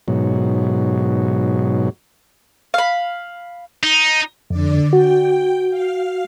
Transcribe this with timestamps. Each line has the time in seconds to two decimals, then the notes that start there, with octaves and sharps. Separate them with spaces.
0.08 G#2 B2 F#3
2.74 F5 B5
3.83 D#4
4.50 F2 D3 D5
4.93 F#4 G5
5.70 F5